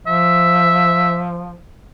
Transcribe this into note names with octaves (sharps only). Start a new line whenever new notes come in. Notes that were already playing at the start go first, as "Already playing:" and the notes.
F3 E5